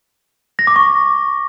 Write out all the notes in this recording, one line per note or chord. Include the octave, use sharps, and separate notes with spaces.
A#6
D6
C#6